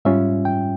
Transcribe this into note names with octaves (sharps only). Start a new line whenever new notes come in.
G#2 G3 C#4 F4 E5
G5